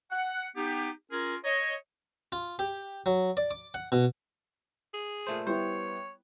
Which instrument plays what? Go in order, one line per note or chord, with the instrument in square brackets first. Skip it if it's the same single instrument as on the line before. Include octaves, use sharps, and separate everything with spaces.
[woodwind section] F#5
B3 D#4 G4
C#4 F4 G#4 A#4
C#5 D#5
[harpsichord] F4
G4
F#3
D5
D6
F#5
B2
[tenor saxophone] G#4
[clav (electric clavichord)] A#2 A3 C5
[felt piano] G3 B3 E4 [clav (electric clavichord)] C5 [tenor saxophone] C#5